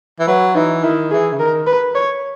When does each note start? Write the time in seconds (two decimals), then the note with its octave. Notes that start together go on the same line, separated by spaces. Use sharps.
0.19 E3
0.27 F#3 B4
0.55 E3 D#4
0.83 D#3 E4
1.12 E3 G#4
1.32 C#3
1.40 D#3 A#4
1.67 B4
1.95 C#5